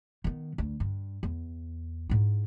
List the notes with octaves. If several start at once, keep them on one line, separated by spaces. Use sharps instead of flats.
D#3 B3
D2
G2
E2
G#2 E4